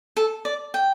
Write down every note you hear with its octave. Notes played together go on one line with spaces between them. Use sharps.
A4
D5
G5